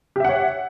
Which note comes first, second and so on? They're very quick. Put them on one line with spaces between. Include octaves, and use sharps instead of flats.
G4 E5 F#5 C#5